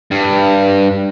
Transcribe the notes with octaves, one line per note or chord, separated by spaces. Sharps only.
G2